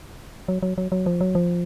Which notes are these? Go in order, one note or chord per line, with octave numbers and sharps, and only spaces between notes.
F#3
F#3
F#3
F#3
F3
F#3
F3